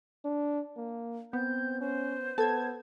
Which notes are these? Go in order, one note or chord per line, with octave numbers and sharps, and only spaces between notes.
D4
A#3
B3 C4 G6
C#4 C5
B3 A4 A5 G#6